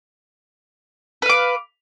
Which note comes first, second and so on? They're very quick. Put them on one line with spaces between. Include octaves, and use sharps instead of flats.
B4 F5 D6